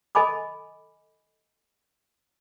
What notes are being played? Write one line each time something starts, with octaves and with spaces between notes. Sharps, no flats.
A4 D#5 G#5 B5 D6